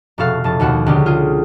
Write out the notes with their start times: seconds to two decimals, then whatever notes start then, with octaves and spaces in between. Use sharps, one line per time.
0.18 F1 B2 F#4 A4 F5
0.44 F1 A5
0.60 D#2 B2 F#4 F#5 E7
0.86 C#2 D3 G4
1.06 F4 G#4